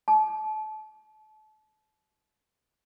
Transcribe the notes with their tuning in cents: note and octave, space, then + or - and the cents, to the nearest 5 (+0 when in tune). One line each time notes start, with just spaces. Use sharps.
A5 -30